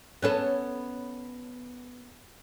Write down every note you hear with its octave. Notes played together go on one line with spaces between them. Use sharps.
B3 C#4 A4